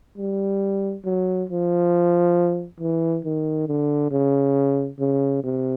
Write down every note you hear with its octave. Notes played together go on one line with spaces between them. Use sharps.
G3
F#3
F3
E3
D#3
D3
C#3
C#3
C3